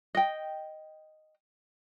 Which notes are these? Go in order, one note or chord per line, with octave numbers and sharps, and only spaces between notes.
D#5 G5